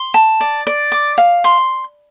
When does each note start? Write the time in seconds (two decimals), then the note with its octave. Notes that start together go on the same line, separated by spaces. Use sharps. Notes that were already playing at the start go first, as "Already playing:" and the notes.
Already playing: C6
0.14 A5
0.41 D5
0.67 D5
0.92 D6
1.18 F5
1.44 C6